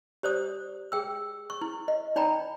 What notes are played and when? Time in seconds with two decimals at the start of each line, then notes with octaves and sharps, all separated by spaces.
0.23 G4 C5 D5 D#6
0.92 G#4 G5 E6
1.50 C#6
1.61 E4
1.88 D#5
2.16 D#4 D5 G5 A#5 B5